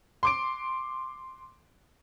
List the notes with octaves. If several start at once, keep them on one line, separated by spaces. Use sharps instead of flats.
C6 D6 D7